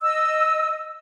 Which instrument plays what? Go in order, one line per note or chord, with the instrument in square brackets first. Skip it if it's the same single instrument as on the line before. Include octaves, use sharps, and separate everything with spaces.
[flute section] D#5 E6